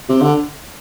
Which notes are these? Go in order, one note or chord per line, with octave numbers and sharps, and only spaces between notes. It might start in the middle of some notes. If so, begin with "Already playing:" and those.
C3
D3